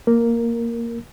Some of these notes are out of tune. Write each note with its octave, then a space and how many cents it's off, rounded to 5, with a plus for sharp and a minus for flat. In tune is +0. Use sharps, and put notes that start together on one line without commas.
A#3 +0 A#4 +0